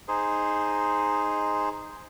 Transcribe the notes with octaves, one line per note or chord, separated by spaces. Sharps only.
D#4 G#4 C5